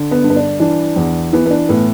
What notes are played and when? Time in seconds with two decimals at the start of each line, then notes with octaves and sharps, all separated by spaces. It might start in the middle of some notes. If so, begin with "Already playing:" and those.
Already playing: D3
0.11 B3
0.23 G2
0.30 B3
0.36 D4
0.60 E3 D4
0.96 E2
1.33 E3 B3
1.46 B3
1.50 D4
1.69 A2 B3